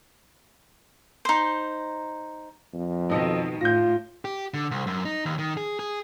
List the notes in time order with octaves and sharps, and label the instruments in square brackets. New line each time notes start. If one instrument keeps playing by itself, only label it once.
[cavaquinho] D#4 C5
[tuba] F2
[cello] B2 D#3 [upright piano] D#4 A4 D#5
[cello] A2 [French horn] F4 [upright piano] G6 A#6
[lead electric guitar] G4
D3
C2
F#2
D#4
D#2
D#3
G#4
G#4